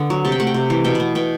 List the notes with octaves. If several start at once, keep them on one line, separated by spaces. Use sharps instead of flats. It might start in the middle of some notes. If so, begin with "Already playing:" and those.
Already playing: D3 B3
F#3
C3 A5
G5
A3 F#5
G5
C3
E3
B2 G5
B3 B5
B2 G5